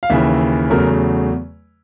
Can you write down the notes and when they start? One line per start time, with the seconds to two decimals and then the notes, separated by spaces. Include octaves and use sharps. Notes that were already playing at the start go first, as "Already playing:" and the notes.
0.03 F5
0.10 D#2 C#3 E3 E5
0.70 E2 C#3 F#3 A3 A#4